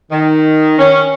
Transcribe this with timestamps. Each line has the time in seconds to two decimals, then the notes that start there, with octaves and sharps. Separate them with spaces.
0.12 D#3
0.79 C#4